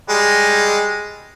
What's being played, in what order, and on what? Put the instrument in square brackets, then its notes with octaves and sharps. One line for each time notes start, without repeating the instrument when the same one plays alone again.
[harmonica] G3 G#3